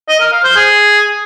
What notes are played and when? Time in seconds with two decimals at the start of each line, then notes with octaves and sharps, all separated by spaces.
0.08 D#5
0.20 A#4
0.32 F5
0.44 C5
0.56 G#4